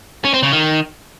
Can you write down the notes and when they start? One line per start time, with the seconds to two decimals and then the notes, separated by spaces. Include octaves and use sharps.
0.25 C#4
0.34 C4
0.43 C#3
0.52 D#3